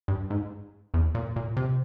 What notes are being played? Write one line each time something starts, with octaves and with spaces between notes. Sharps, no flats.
G2
G#2
E2
A#2
A#2
C3